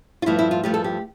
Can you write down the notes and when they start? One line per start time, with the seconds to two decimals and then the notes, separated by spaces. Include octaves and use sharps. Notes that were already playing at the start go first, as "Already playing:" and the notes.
0.22 F4
0.26 G2 F3 A3 E4
0.39 E4
0.51 F4
0.63 G2 F3 A3 G4
0.74 A4
0.84 G4